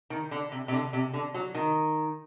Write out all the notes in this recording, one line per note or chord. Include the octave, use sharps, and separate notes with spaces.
D#3
D3
C3
C3
D3
C3
D3
F#3
D#3